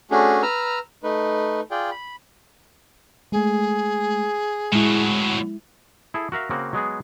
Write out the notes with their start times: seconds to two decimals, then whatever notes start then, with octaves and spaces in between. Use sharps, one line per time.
0.11 A3 C#4 D4 F#4 G#4
0.42 B4 A#5 E6 F6
1.03 A3 D#4 B4
1.71 F4 G#4 D5 G5
1.91 B5
3.32 G#3 A3 G#4
4.72 A2 F#3 G#3 E4
6.14 E4 G#4 A4
6.32 F#4 A#4 E5 F5
6.50 C#3 A#3 C4 F#4
6.73 F#3 G#3 B3 G#4